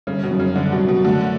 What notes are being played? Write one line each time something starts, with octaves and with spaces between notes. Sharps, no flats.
G1 C#3
B2
F#2
C#3
G1 D3
B2
F#2
B2
D3 A3